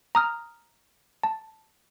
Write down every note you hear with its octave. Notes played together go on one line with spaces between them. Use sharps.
A#5 D#6 F6
A5